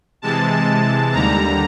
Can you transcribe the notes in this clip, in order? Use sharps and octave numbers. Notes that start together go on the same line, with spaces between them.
C3 E3 G#3 A5
D#2 D3 G3 A#5